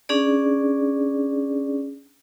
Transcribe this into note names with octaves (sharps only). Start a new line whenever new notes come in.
C#4 D4 G#4 D5